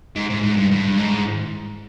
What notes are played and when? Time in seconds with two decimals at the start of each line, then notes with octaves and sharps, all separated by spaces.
0.16 G#2
0.29 G#2
0.42 G#2
0.56 G2
0.71 G2
0.98 G#2